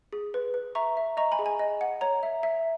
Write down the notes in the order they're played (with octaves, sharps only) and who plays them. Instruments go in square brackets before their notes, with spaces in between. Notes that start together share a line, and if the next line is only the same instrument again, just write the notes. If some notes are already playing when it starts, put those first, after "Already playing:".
[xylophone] G#4
B4
B4
E5 A#5 C#6
E5
D#5 A#5 C#6
G#5 B5
G#4
G#5
D#5
F#5
C#5 A#5
E5
E5